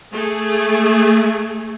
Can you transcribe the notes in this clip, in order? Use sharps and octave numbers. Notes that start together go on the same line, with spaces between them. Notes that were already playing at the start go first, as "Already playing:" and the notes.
A3 G#4